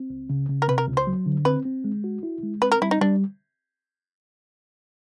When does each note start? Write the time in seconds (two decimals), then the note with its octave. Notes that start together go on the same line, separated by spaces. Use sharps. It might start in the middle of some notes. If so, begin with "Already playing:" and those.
Already playing: C4
0.10 C#2
0.30 C#3
0.49 C#3
0.62 A#4
0.68 C3 B4
0.78 A#4
0.88 C#2
0.97 C5
1.07 F#3
1.26 D3
1.45 C4 B4
1.65 C4
1.84 G#3
2.04 F#4
2.23 E4
2.43 G#3
2.62 C4 B4
2.72 A#4
2.82 G3 E4
2.91 D#4
3.01 G3 D4